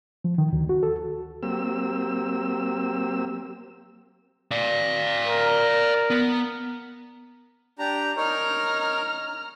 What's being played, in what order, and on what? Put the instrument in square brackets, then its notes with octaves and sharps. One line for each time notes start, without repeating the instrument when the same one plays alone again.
[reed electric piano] F3
D#3
D2
F#4
A4
[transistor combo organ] F#3 A#3 C4 G4 E6
[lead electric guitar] D5 F5
[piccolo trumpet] A#4
[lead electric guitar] B3
[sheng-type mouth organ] D4 G4 A#5
[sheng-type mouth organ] D#4 A#4 C#5 [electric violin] A#5 F6